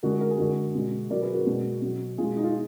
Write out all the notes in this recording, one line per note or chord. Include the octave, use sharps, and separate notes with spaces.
D3 G#3 F#4 A#4
A#4
G#4
D3 G#3 F#4 A#4
B2 G#3
B2 F#3 A#4 D5
G#4 B4
F#4 A#4
B2 G#3
B2 F#3
B2 G#3 F4 G#4
D#4
F4
D#4